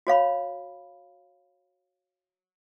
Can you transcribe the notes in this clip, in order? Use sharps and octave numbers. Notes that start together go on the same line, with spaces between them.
F#4 C#5 F5 B5